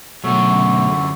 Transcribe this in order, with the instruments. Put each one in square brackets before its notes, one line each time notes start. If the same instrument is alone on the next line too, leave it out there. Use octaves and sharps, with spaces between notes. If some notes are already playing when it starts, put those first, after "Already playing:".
[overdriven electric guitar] F#2 D3 [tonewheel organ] B2 F#3 A3 [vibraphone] F#5 C#6 E6